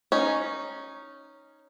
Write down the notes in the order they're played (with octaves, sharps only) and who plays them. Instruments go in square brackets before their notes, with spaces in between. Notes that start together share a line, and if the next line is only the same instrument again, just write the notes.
[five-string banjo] C#4 D#4